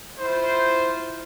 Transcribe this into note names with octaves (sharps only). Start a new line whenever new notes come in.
E4 F4 C5